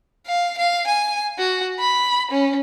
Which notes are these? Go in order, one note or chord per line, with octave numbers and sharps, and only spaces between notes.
F5
F5
G#5
F#4
B5
C#4